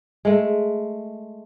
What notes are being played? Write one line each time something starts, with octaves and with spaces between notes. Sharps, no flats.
G#3 A3